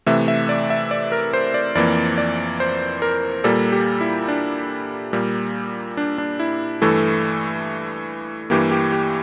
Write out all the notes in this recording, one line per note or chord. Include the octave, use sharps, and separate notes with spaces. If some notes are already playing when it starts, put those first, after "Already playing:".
C3 E3 A3 E5
E5
D5
E5
D5
A#4
C5
D5
F2 E3 A#3 D5
D5
C5
A#4
A#2 G3 A#3 A4
G4
E4
D4
A#2 G3 A#3
D4
D4
E4
G2 E3 A3 A4
G2 E3 A#3 G4
G4
G4